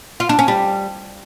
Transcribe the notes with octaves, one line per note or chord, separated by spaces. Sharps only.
F4
D4
C#4
G3